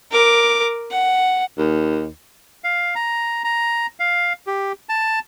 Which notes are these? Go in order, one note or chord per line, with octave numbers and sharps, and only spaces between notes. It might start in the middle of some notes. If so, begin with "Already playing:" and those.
A#4 D6
F#5
D#2
F5
A#5
A#5
F5
G4
A5